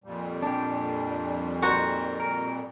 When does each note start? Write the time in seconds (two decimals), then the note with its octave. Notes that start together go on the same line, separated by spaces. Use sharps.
0.04 F2 A#2 G3
0.43 D4 G4
1.63 D#4 F#4 A#4 C5
2.20 A#4